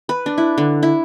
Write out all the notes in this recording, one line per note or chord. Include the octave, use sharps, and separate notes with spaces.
B4
D4
E4
D3
E4